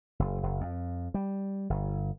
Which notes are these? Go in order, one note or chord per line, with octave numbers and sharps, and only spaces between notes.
F#1
F#1
F2
G3
G1